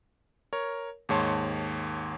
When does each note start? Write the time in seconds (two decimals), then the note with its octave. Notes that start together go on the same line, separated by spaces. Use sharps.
0.53 A#4 C#5
1.09 D#2 G#2 C#5 A5 C6